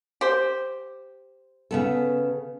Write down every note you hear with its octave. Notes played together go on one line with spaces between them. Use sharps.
G4 C5
C#3 B3 A4